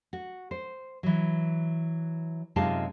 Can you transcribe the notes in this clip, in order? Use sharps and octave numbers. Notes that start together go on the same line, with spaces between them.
F#4
C5
E3 F#3
F#2 C3 G#3 D#4 F4 A5